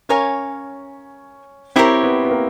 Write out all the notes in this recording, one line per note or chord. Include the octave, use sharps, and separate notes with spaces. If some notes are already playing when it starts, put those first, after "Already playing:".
C#4 A#4 C#5 F5 G#5
C4 E4 G4 A#4 C#5
B3
B3
A#3